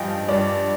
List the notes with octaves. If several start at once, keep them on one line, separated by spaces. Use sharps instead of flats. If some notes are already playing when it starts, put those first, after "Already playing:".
Already playing: G2 F3 D#5 F5 G5 G#5
G2 D5